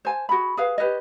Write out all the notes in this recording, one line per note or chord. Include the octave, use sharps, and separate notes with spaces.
C5 G#5 A5
F#4 G#4 B5
G#4 B4 F5
G4 B4 C#5 D#5